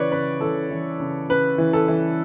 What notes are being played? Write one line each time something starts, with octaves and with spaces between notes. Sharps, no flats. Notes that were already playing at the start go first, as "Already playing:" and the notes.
Already playing: C#3 E3 B4 C#5 D5
C#3 B4
E3 A4
E3
C#3
C#3 B4
E3
A4
E3